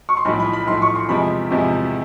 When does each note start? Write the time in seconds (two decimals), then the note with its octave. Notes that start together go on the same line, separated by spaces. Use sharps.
0.09 C#6
0.17 C6
0.25 B1 A2 F3 B5
0.40 B5
0.53 B5
0.67 B1 A2 F3 C6
0.82 C#6
0.96 C6
1.09 E2 C3 F3 G#3 B5
1.51 E2 C3 F3 G#3